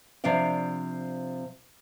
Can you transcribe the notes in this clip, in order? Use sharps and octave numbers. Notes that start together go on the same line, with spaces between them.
C3 F3 D4 D5 F5